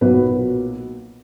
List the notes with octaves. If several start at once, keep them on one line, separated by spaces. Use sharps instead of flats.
B1 A#2 F#3 A#3 B4